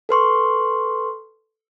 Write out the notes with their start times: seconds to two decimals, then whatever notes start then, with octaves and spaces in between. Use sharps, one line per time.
0.09 A4 B4 C6 C#6